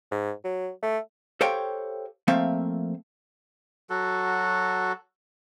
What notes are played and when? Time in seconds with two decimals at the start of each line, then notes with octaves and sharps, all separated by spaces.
0.11 G#2
0.44 F#3
0.83 A3
1.41 G4 A4 C5 C#5 F5 G5
2.28 F3 A3 A#3 C4 E5 F5
3.90 F#3 F#4 A4